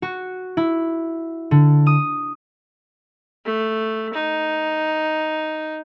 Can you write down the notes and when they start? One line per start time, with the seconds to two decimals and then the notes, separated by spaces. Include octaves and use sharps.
0.02 F#4
0.57 E4
1.51 D3
1.87 D#6
3.45 A3
4.14 D#4